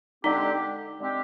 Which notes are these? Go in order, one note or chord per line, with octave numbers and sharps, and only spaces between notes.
D3 G#3 C4 D#4 G4
D3 G#3 C4 G4